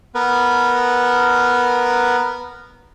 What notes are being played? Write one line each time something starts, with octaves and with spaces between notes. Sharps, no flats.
B3 A#4 B4